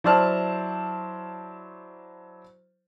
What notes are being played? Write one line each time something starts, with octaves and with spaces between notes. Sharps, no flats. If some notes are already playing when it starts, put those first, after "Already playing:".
F#3 E4 C5 D5 A5 F6